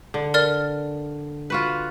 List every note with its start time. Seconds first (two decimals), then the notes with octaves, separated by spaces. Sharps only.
0.14 D3
0.34 A#4 D5 F6
1.50 F4 F#4 B4